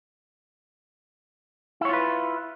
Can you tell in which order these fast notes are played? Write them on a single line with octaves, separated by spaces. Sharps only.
E4 C#5 F4 B4